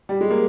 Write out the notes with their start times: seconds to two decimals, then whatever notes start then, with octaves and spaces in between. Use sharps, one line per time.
0.09 G3
0.21 G#3
0.30 A#3